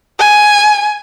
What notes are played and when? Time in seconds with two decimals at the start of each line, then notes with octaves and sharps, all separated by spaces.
0.19 G#5